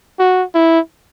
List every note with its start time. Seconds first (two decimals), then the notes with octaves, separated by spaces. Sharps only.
0.19 F#4
0.55 E4